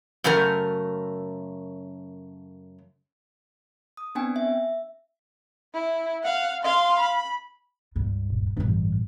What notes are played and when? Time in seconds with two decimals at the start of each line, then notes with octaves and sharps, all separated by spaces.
0.24 F#2 C#3 A3 A#4
3.97 D#6
4.15 B3 C4 D4 G5 G#5
4.36 E5
5.74 E4
6.24 F5 F#5
6.63 F5 C6
6.99 B5
7.96 C#2 G2
8.30 D#1
8.57 A1 G2 D3